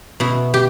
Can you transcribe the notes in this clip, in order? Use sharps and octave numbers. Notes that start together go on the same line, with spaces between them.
B2 E4
G4